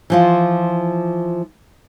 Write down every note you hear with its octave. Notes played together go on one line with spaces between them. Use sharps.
E3 F3 F4